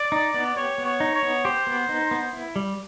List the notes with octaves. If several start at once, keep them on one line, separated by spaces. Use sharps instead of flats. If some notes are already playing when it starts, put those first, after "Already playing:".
Already playing: D5
D#4
B3
G4 C#5
B3
C#5
D#4
C#5
B3
G4 C5
B3
D#4
B3
E4
G3